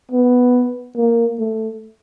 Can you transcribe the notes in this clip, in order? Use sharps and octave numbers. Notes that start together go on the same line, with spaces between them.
B3
A#3
A3